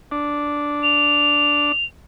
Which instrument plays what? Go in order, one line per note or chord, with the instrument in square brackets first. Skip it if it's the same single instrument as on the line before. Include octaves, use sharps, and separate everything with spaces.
[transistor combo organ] D4
[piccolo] F7